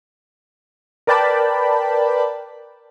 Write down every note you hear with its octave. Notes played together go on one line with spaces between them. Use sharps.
A#4 B4 D5 G5 A5 B5